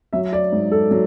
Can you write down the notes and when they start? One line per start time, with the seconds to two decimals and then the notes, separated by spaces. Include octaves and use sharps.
0.13 F#3 E5
0.33 D5
0.52 G#2
0.72 A4
0.91 F#3